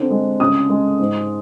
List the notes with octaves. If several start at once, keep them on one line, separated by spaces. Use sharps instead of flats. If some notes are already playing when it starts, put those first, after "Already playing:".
Already playing: D3 C4
G#3
C#3 D#6
G#3
G#2